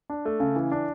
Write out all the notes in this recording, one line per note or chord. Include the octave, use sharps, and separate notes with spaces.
D4
A3
C#3
E3
D4